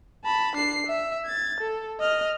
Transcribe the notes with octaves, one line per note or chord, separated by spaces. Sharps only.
A5 B5
D4 C7
E5
G#6 A6
A4
D#5 F6